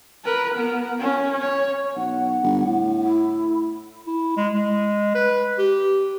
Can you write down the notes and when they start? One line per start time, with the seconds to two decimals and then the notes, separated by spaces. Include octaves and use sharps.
0.25 A#4 B4
0.54 B3 A#4
1.00 C#4
1.41 C#5
1.96 B1 F#5
2.43 G1
2.65 A2
3.04 E4
4.07 E4
4.37 G#3
4.55 G#3
5.15 B4
5.59 G4